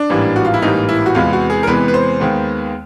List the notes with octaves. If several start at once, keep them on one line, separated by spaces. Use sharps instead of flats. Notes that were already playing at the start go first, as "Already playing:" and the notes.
Already playing: D4
A1 G#2 E3 G3 A#3
F#4
F4
E4
A1 G#2 E3 G3 A#3 D#4
E4
F#4
E2 C3 E3 G#3 B3 F4
F#4
G#4
A#4
E2 C3 E3 G#3 B3 B4
B4
C5
D#2 D#3 G#3 B3